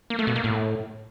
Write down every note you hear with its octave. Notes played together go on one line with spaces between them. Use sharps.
A#3
A3
B2
A#3
A2